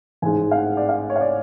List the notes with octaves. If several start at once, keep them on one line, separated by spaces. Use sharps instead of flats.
A1 G#2 G#3 G#5
F5
F#5
D5
F5
C#5
F5
D5